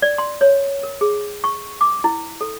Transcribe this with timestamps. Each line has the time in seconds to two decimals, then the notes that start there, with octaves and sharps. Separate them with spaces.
0.02 D5
0.18 C6
0.41 C#5
0.83 A#4
1.01 G#4
1.44 C#6
1.81 D6
2.04 E4
2.41 A4